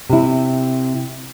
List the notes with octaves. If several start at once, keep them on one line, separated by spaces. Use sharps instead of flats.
C3 E4